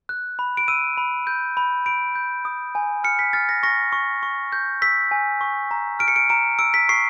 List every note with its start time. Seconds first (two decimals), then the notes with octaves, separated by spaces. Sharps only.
0.09 F#6
0.39 B5
0.57 D7
0.68 E6 D#7
0.98 B5
1.27 G6
1.57 B5
1.86 B5 D7
2.16 G6
2.45 D#6
2.75 G#5
3.04 F6 C#7
3.19 B6
3.33 F6 A6
3.49 A#6
3.63 C#6 A#6
3.92 C#6
4.23 C#6
4.52 G6
4.82 E6 B6
5.11 G#5
5.41 C#6
5.71 A#5
5.99 F6 D7
6.08 C#7
6.16 D7
6.30 A#5 D7
6.59 E6 D7
6.74 B6
6.89 C#6 C7